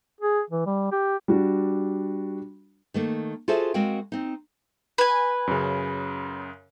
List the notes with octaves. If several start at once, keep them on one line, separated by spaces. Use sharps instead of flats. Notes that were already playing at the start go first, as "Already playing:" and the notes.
G#4
E3
G3
G4
G3 D4 F#4
D#3 A3 A#3
F4 F#4 G#4 A4 C5 E5
G#3 C4 F#4 A#4 F5 G5
C4 D#4
B4 G#5
F#2 C#3